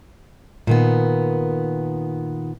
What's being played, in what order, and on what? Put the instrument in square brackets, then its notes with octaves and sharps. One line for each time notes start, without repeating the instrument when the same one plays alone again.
[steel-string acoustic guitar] A#2 D#3 B3